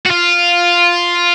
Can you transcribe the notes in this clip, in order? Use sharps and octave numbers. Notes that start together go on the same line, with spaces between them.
F#4
F4